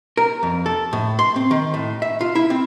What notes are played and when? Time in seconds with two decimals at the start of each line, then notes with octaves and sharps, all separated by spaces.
0.17 A#4
0.43 F2
0.66 A4
0.93 A2
1.19 C6
1.36 C4
1.51 D#3
1.74 A2
2.02 E5
2.21 F4
2.35 E4
2.50 C4